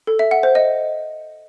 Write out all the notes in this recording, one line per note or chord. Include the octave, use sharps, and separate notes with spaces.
A4
E5
F#5
C5
D#5